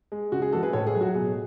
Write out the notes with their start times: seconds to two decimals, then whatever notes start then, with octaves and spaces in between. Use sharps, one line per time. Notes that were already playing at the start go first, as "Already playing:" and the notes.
0.12 G#3
0.32 C#3 F#4
0.42 G#4
0.52 E3 G#3 F#4 A4
0.63 G#4 B4
0.73 A2 A4 C#5
0.87 G#4
0.95 F#3 A3
1.01 F#4
1.15 B2 G#4